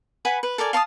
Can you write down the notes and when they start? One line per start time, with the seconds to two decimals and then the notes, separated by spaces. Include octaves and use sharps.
0.25 B4 F#5 G#5 B5
0.43 B4
0.58 A4 A#4 D5 G#5
0.73 F5 A5 C#6 D#6